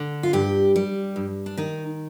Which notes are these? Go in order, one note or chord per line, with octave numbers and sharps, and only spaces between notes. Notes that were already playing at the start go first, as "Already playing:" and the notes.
Already playing: D3
F4
G2 G4
G3
G2
D4
D#3 D#4